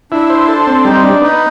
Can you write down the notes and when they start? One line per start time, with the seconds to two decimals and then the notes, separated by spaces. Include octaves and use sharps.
0.12 D4 E4
0.30 C5
0.48 A4
0.67 C4
0.85 G3 D#4
1.03 D4
1.22 B3 D#4